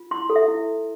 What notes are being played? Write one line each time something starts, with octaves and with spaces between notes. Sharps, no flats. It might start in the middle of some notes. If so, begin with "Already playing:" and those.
Already playing: F4
E4 C6
A4
E5
E4